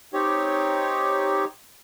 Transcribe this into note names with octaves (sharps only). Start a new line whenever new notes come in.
C4 D#4 G4 C#5